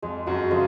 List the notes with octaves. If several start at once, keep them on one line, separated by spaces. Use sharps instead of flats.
F2 G#3
F#2 F#4
C#3 F3 G#3